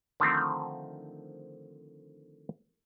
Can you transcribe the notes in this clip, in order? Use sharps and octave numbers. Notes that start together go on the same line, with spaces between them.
D3 D#3 F3 A3 C4